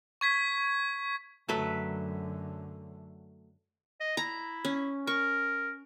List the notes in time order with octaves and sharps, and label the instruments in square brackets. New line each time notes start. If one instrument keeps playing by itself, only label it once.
[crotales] C#6 G#6 B6
[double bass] F#2 D3 [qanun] F#3 A3 B4
[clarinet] D#5
[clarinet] E4 [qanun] A#5
[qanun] C#4
[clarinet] A#4 [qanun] C#6